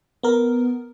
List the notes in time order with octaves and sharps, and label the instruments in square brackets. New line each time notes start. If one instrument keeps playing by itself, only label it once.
[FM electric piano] B3 A#4